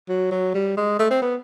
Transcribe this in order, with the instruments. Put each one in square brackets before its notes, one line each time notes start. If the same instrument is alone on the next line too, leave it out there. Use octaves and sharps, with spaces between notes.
[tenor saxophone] F#3
F#3
G3
G#3
A3
C4
B3